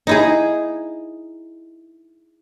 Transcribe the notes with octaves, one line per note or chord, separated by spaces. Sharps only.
D#4 E4 G#4